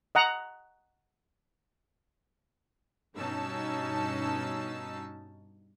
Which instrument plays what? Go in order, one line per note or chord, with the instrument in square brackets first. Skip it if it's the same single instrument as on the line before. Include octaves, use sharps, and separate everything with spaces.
[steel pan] D#5 F#5 A#5
[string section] G2 B2 C#4 D#4 A5 E6